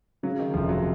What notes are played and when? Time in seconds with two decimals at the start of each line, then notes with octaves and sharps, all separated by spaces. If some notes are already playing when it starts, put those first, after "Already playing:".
0.23 C#3 F#3
0.39 D#3
0.54 F1 F3
0.69 F#3